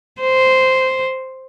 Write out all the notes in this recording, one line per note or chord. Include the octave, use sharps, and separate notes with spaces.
C5